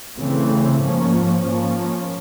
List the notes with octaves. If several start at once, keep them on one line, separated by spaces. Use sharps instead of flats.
C#3 E3 A3 C4
G#2 F3 A#3 C#4
G#2 F3 A#3 C#4